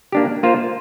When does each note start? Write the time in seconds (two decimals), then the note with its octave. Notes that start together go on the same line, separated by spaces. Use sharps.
0.12 A#3 D4 G4
0.43 A#3 F4 C5